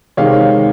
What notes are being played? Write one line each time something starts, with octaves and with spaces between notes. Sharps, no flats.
C3 D#3 G#3 C#5 F5